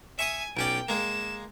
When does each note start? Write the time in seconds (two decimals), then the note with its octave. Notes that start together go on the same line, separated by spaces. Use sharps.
0.19 E5 G#5 C#6 D#6
0.57 B1 C#4 D5 G5 D7
0.89 G#3 A#3 E7